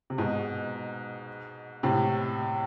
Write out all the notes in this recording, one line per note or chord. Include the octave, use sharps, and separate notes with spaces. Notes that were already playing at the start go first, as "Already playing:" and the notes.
C3
G#2 B2
A2 C3